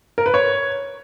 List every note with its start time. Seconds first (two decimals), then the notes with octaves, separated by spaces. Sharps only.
0.18 A#4
0.26 B4
0.34 C#5